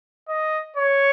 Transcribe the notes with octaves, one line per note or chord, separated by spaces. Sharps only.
D#5
C#5